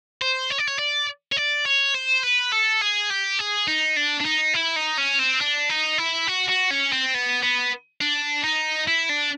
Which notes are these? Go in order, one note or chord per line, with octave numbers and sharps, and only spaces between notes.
C5
C#5
D5
C#5
D5
C#5
D5
C#5
C5
B4
A4
G#4
G4
G#4
D#4
D4
D4
D#4
E4
D#4
C#4
C4
D4
D#4
E4
F#4
F#4
C#4
C4
B3
B3
D4
D#4
E4
D4